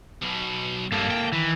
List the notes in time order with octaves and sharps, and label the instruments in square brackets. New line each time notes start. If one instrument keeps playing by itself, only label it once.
[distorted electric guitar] B1 B2
[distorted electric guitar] G2 [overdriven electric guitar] A#3 A4
[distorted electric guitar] G5
[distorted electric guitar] D#3 [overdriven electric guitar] E3